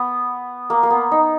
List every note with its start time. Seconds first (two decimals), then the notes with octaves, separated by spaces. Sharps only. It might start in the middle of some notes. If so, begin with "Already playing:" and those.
Already playing: B3
0.70 A#3
0.83 A#3
0.90 B3
1.12 D#4